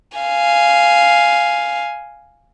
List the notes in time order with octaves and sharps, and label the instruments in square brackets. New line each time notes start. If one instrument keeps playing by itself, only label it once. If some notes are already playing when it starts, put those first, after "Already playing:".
[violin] F5 G#5